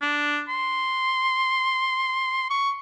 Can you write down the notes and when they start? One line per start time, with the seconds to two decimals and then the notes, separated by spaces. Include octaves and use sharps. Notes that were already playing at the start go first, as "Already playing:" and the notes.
0.02 D4
0.48 C6
2.50 C#6